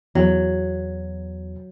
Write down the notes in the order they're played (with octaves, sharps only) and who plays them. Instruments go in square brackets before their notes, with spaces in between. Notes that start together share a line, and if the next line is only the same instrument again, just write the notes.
[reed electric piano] E2 [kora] F#3